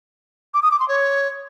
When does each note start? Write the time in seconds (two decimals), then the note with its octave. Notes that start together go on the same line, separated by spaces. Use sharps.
0.54 D6
0.63 D#6
0.71 D6
0.80 C6
0.88 C#5